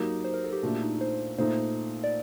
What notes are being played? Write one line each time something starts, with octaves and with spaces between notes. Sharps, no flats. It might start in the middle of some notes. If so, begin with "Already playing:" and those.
Already playing: F#3 A#3 D#4 G4
C5
A#4
A4
G4
A#2 A3 D4 F#4
D#4
C5
A#2 A3 D#4 C5
D5